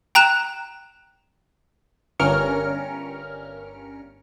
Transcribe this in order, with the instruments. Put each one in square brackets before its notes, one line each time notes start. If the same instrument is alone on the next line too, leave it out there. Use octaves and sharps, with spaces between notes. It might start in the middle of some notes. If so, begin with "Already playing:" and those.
[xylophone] G5 A#5 F#6 E7
[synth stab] G1 G2 C#4 A#4 F6 C#7